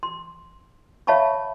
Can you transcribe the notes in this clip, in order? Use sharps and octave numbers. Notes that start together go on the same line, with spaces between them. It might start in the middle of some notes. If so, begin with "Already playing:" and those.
C6
C#5 E5 F5 A5 B5 C#6